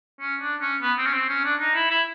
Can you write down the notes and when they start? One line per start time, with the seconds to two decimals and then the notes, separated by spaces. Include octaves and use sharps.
0.20 C#4
0.41 D4
0.61 C#4
0.82 B3
0.98 C4
1.06 C#4
1.13 C4
1.29 C#4
1.44 D4
1.60 D#4
1.75 E4
1.91 E4